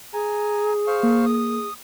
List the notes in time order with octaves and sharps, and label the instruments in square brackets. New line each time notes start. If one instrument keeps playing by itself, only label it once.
[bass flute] G#4 [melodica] G#5 A#5
[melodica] C5 F5 C#6
[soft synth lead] A#3
[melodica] D#6